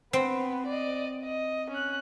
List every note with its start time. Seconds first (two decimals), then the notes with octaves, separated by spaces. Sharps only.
0.13 B3 C4
0.66 D5 D#5
1.24 D#5
1.70 C#4 F#6